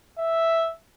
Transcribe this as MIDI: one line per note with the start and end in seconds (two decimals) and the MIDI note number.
0.18 0.72 76